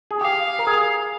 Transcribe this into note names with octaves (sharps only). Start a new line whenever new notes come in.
G#4
G4 F5
A#4
G#4